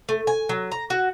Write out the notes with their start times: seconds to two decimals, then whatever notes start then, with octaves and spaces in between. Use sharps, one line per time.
0.09 A3
0.27 G#5
0.49 F#3
0.72 A#5
0.90 F#4